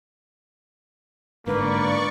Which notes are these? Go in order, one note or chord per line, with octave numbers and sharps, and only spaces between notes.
G1 G#2 D3 A#3 B4 D5 C#6